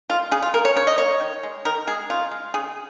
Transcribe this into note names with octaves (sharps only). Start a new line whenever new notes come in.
G#3 F4
C#3 G#4
F4
A#3 A#4
C#5
C#3 C#5
D#5
A#3 C#5
D#3
G#3
D#3 A#4
G#3 G#4
C#3 F4
G#3
C#3 G#4